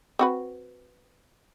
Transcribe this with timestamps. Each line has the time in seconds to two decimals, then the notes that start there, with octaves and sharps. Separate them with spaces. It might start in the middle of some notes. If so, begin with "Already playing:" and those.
0.19 C4 F#4 B4